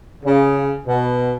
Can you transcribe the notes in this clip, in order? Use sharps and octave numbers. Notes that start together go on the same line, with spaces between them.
C#3
B2